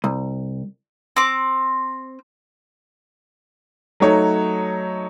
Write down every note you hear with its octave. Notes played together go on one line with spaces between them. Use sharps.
C2
C4 D6
F#3 A3 D#4 C#5